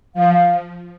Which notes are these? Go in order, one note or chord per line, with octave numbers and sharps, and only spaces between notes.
F3 F5
F5